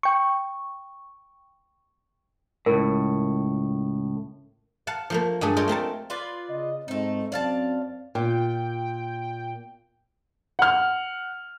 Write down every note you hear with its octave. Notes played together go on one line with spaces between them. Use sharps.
G5 C#6
C#2 A2 A#4
F5 F#5 A5
F3 A3 A#3
G2 G#3 A3 G#4
F4 G#4 A4 C#5 D#5 G5
A3 C4 A#4 A5
F4 B4 D5
C#3 D#5
G#2 A3 C4 D#4
F#2 C4 D5 F5 A5
A#2 G5
F#5 F6